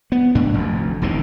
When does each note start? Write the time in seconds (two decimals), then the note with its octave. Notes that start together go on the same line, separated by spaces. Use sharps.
0.12 B3
0.35 G#2 D4
0.54 F1 D2
1.02 E1 C2 C3 D#3